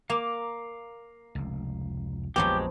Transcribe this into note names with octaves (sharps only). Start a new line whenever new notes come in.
A#3 F5 A#5 D6
F1 C#2
A#1 F2 F3 F#3 G#3 B3 G4